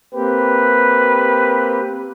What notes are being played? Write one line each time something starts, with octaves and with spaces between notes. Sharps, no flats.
A#3 C4 G4 B4